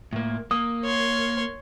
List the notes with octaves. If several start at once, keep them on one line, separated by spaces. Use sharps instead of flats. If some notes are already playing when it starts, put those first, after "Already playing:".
A2 A#3
A#3 D#6
C#5 C6